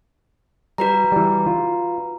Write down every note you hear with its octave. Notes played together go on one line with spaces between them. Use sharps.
G3 F#4 B4 A#5
E3 G3
F4